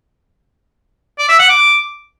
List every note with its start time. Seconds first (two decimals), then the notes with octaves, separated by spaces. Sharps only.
1.19 D5
1.29 E5
1.39 F#5
1.49 D6